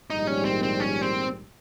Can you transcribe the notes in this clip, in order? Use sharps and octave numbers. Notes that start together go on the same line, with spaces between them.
A#1 G#2 D#3 G3 D#4
C#4
C4
C4
C#4
C4